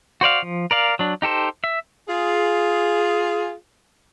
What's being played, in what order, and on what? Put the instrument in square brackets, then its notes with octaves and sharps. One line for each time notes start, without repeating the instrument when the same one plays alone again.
[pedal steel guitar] F#4 C5 D5 F5
F3
A#4 D5 F5
F#3 D4
D#4 G4 A4 C5
E5
[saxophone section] F4 G#4